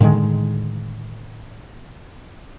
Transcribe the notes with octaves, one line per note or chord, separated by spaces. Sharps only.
A2 D3 D#3 G#3